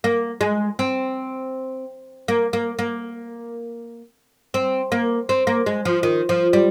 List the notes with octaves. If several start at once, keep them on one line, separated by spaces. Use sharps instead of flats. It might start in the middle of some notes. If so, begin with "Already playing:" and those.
A#3
G#3
C4
A#3
A#3
A#3
C4
A#3
C4
A#3
G#3
F3
D#3
F3
G3